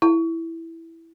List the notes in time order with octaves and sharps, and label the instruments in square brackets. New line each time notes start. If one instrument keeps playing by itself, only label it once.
[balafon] E4